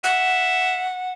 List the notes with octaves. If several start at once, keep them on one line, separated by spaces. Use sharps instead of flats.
E5 F#5